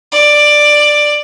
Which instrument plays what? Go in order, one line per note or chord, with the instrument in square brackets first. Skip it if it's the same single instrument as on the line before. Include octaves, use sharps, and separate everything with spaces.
[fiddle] D5